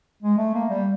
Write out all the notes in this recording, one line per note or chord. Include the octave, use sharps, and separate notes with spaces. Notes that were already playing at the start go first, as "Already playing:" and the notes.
G#3
A3
A#3
G3